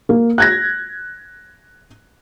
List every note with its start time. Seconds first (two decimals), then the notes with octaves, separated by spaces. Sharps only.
0.09 A#3
0.38 F#6 G#6 A#6